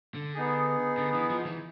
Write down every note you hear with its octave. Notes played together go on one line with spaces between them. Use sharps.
D3
B3 D#4 G#4
D3
E3
F3
E3